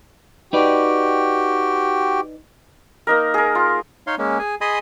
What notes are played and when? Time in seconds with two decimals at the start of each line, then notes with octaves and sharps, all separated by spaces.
0.53 D#4 F#4 G4 B4 D5 G5
3.07 A#3 D#4 A#4
3.34 G#4 A#4
3.55 F4
4.07 D#4 C#5 F5 C6
4.18 G#3 A#3 C#4
4.39 G#4 G#5
4.61 G#4 D#5 G#5 B5 C6 D#6